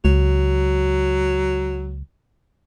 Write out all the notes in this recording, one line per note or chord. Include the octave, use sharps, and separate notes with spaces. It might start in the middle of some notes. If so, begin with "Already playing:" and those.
C#2 F#3